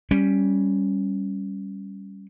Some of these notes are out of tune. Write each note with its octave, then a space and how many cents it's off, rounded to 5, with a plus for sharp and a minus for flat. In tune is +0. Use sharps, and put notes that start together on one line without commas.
G3 +0 C#4 +0